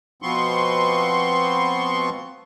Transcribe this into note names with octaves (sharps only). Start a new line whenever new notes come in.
B2 F3 B3 C4 C6 C#6